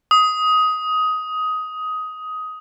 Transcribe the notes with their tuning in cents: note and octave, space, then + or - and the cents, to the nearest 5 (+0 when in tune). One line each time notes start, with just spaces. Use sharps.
D#6 +15